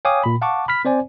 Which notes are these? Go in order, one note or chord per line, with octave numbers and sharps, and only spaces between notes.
C#5 F5 G5 G#5 D6 D#6
A#2 B5
F5 F#5 A5 C#6 D6
B5 F6 B6
C4 C5 D5 G#5